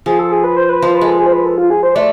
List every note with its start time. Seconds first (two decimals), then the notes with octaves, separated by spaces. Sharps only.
0.06 F3 G#4
0.19 A4
0.31 G#4
0.44 B4
0.56 C5
0.69 B4
0.82 F3 C5
0.95 B4
1.01 G#3
1.07 A4
1.20 G#4
1.26 C5
1.32 B4
1.45 A4
1.58 F4
1.70 G#4
1.83 C5
1.95 A3 D5